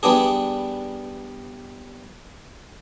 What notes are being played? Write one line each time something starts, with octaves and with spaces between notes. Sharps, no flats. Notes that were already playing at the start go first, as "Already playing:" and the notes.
G3 B3 D4 G#4